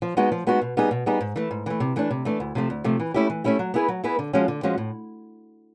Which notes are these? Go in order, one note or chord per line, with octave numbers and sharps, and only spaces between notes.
F3
G#3 B3 D#4 F#4
F3
G#3 B3 D#4 F#4
B2
G3 B3 D#4 G#4
B2
G3 B3 D#4 G#4
G#2
E3 A3
G#2
E3 A3
C3
E3 A3 D4
C3
E3 A3 D4
D2
C3 F3 A3
D2
C3 F3 A3
E3
A3 C#4 E4 G4
E3
A3 C#4 E4 G4
F#3
B3 E4 G#4 B4
F#3
B3 E4 G#4 B4
D3
F3 G#3 C#4 F#4
D3
F3 G#3 C#4 F#4
A2